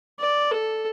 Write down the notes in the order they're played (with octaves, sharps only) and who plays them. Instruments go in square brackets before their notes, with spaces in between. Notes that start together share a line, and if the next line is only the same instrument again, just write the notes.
[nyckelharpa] D5
A4